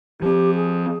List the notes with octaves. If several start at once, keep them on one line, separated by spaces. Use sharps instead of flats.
F3 C4 G4
G#4